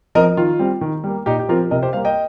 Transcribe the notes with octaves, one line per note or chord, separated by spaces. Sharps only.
F3 C4 A#4 D#5
D#3 F4
G3 C4
D#3
G3 A#3
A#2 D#4 G4
G4
F3 C4 F4 A#4
C3 A#4 D#5
G4 C5
G3 A#3 C5 F5
D#5 G5